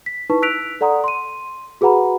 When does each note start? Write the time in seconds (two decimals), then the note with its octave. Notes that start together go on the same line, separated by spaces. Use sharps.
0.06 B6
0.30 D#4 E4 B4 A5 C#6
0.42 E6 F#6 B6 D7 F7
0.81 A4 D5 F#5 A#5 C6 D#6
1.04 C6 D#7
1.81 F#4 G#4 B4 F#5 A#5 B5